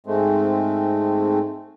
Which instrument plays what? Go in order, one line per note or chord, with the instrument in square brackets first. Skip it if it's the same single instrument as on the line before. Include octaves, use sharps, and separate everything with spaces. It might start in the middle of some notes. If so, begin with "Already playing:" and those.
[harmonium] G#2 G#3 A3 C4